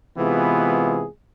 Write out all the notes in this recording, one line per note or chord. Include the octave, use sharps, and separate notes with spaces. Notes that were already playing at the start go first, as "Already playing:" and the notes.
C3 E3 G#3 B3 F4 G#4